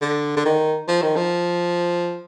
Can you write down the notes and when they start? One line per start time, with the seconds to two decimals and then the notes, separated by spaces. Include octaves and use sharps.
0.01 D3
0.37 D3
0.45 D#3
0.88 F3
1.02 D#3
1.16 F3